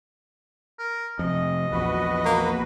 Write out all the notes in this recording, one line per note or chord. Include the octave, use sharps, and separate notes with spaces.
A#4
F2 C3 D#5
A#1 E2 F#4 B4
A#3